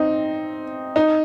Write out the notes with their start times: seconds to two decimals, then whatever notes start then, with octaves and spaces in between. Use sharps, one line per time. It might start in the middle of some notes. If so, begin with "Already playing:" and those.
Already playing: C4 D#4
0.96 D#4